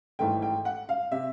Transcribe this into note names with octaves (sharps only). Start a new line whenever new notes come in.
G#1 G#2 E3 A3 G5
G5
F#5
F5
C3 E5